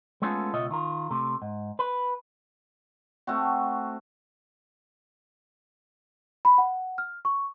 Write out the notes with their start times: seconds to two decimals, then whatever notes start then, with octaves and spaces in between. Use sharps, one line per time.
0.22 G#3 A3 B3 C#4 F4 A4
0.54 C#2 B2 F4 C#5 D#5 E5
0.71 D#3 F4 A#4
1.11 C3 A3
1.42 G#2
1.79 B4
3.27 A3 C4 F#4
6.45 B5
6.58 F#5
6.98 F6
7.25 C#6